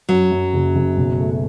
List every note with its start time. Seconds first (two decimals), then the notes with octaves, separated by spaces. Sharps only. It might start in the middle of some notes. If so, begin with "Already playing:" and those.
0.09 F#2 F#3
0.31 F#2
0.54 F#1
0.75 F#1
0.97 B1
1.20 A3